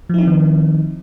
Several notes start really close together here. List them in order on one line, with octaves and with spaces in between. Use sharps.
F3 E4 D#4 C4 D#3